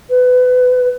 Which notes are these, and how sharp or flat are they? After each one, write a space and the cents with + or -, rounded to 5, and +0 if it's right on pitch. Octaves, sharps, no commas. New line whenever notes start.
B4 +25